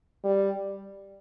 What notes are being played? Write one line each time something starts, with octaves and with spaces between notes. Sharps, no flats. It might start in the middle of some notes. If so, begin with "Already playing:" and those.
G3